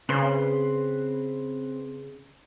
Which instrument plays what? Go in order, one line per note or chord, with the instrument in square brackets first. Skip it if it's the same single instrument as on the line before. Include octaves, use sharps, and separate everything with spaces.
[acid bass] C#3 [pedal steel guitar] C4 B4 C6